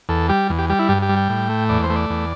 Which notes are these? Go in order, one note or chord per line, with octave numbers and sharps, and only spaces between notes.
E2 A4
G3 G4
E2
G4
G3 G4
E4
G2 G4
G4
G3
G5
A2
A3
E2 D5
C5
A3
D5
E2